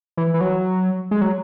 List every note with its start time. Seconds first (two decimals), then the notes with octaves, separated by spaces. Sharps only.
0.17 E3
0.34 E3
0.41 F#3
1.11 G#3
1.21 F#3